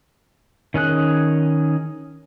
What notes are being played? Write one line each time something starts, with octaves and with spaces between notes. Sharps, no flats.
D#3 C#4 G#4 F#6